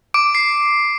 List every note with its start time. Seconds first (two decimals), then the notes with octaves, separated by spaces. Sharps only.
0.14 D6 D7
0.35 C7